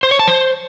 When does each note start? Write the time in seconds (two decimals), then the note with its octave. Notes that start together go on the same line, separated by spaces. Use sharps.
0.03 C5
0.11 C#5
0.19 A5
0.28 C5